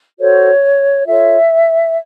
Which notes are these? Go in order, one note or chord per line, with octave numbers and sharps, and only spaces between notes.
F#4 A4 C5 C#5
F4 A4 C#5 E5